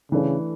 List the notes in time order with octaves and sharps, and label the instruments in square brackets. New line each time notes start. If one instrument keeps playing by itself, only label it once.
[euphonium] C#3 [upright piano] E3 A3 D4 A4